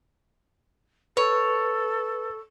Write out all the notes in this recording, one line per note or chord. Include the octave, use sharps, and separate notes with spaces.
A4 B4 C#5